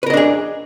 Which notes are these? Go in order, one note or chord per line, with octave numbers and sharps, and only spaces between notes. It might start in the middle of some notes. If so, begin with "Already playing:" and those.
D4 G#4 A#4 B4 D#5